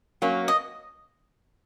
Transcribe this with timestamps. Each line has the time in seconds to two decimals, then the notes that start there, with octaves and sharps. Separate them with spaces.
0.22 F#3 A#3 C#4
0.48 D#5